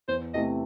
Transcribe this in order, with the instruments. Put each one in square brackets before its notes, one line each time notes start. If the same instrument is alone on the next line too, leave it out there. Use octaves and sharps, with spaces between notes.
[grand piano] E2 [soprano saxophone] C5
[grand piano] C3 E3 A3 C4 [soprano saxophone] D#5